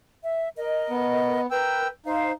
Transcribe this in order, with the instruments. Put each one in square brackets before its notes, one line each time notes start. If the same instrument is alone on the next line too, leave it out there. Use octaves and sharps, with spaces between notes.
[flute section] E5
A#4 D#5
[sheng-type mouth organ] B3
[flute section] A#4 B4 [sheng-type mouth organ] G5 E6
[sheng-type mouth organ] D#4 [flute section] C5 F5